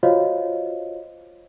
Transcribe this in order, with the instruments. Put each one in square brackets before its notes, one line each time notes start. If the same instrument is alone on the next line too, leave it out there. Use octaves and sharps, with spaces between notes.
[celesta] F4 F#4 C5 C#5 D#5 F5